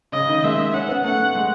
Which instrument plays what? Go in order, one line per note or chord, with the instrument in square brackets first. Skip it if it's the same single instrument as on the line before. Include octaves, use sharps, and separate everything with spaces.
[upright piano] C#3 [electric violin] D#5
[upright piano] D#3
[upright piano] G#3 [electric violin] E5
[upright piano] C#4 [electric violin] F#5
[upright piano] B3
[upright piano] A3 [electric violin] F#5
[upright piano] G#3